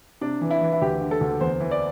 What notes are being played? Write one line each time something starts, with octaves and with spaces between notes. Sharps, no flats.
C3 D4
E3
E4
E3
E4
D2 G4
D3
A4
D2
E2 C5
E3
D5